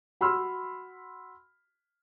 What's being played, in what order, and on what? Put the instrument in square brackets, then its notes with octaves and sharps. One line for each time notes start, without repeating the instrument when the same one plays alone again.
[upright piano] F#4 B5 C6 E6 F6